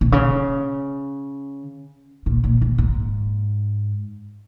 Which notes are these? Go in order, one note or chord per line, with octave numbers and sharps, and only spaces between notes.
B2
C#3
A#2
A#2
A#2
G#2